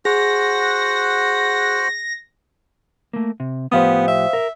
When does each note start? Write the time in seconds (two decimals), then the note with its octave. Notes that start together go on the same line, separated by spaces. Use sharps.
0.05 F#4 G#4 C5 F#5 A#6
3.13 A3 A#3
3.40 C3
3.72 A2 F3 B3 G4 C5 F5 D#6
4.08 E5
4.33 A#4